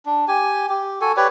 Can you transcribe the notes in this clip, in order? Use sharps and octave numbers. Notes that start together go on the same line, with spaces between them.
D4
G4 G#5
G4
F#4 A4 G#5
G4 B4 C#5 D5